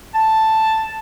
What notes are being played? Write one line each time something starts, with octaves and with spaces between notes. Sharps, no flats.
A5